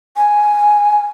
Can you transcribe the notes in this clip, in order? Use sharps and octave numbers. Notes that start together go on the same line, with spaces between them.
G#5